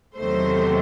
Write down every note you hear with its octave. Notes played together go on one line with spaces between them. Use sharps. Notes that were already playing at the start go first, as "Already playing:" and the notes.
E2 C3 D#3 F#3 A3 C5